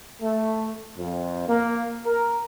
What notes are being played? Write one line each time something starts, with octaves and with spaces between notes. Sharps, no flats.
A3
F2
A#3
A#4